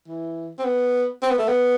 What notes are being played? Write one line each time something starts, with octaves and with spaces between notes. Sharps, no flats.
E3
C4
B3
C4
B3
A3
B3